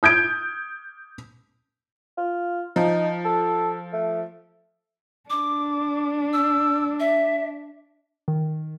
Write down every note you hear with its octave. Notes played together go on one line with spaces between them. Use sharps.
D#6 G6 G#6 D7
F4
F3 D#4
A4
A3
D4 D6
E6
E5
D#3